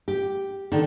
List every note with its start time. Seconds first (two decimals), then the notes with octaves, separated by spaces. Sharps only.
0.08 G4
0.72 D3 D#3